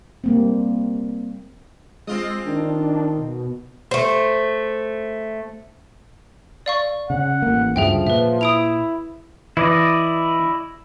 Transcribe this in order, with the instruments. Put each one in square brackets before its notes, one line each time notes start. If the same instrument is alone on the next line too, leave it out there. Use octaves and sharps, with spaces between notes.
[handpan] G3 A#3 C4
[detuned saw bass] G#3 [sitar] C4 F4 D#5
[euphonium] D#3 [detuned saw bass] D4
[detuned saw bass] B2
[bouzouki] A3 C5
[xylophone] D5 F5 C#6
[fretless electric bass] C#3 C#4 [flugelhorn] F#5
[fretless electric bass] A1 A#3
[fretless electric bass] D2 G2 C#3 [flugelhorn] F3 [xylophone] G#4 E5 G5
[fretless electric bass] A#2 [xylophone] B4 E5
[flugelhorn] E4 [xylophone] D#6 D7 F7
[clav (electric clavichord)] E3 [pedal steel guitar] E4 D5 D#5